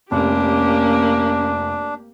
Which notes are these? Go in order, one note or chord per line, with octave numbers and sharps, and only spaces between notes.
F1 A#3 C#4 D4 G4